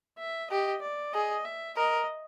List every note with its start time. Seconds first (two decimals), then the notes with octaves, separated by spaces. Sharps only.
0.19 E5
0.51 G4 D#5
0.82 D5
1.13 G#4 D#5
1.45 E5
1.77 A#4 D#5